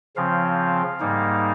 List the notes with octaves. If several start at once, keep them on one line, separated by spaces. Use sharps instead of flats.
C#3 F3 C4 F5
G#2 G3 A#3 D#4